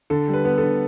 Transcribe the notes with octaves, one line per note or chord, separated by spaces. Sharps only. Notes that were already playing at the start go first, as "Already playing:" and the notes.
D3 A4
G3
B4
B3
A4
D3